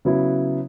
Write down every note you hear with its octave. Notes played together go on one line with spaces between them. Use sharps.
C#3 F#3 B3 E4